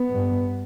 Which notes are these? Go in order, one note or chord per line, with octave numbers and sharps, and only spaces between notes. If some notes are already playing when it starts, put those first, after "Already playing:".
Already playing: B3
G2